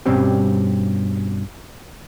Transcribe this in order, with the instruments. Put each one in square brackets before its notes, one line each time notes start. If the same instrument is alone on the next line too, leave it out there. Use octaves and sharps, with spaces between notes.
[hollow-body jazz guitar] G2 B2 G3 C4 C#4 G4